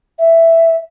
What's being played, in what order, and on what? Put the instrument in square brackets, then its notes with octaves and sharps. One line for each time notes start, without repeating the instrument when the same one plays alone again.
[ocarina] E5